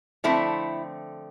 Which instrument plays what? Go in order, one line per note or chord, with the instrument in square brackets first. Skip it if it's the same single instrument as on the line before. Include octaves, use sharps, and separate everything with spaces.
[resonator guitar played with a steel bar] D3 F3 A3 C4 E4